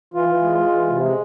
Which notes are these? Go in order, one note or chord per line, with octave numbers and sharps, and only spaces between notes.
E3 F4
E3
G#3
G#3
E3
C3
G#3